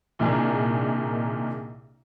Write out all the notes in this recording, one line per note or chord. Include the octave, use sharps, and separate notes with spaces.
C2 A#2 D#3 D4 G#4